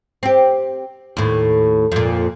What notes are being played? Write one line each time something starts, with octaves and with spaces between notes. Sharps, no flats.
C4 G4
D#2 A2
F2 A#2